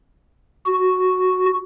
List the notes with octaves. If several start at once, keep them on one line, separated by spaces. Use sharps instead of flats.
F#4